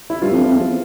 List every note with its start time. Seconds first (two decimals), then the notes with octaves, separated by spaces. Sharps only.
0.10 E4
0.22 G2 F4
0.32 F2
0.43 F2
0.54 E2